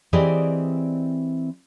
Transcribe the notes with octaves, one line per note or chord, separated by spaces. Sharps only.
E3 C4 G4 G#4 D5 D#5